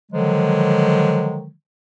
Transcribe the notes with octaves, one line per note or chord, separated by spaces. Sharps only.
D3 D#3 F3 F#3 G#3